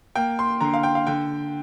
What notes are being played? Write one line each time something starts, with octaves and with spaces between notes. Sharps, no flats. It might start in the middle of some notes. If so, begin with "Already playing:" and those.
A#3 G5
C6
D3 A#5
F5
G5
F5
D3 G5